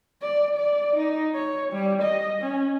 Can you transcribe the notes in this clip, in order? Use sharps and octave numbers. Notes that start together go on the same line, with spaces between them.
D5
D5
D#4
C#5
G3
D#5
C#4